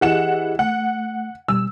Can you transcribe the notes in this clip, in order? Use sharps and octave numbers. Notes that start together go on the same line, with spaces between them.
E3 G4 G#4 D#5 F#5 E7
A3 F#5
B2 G3 E6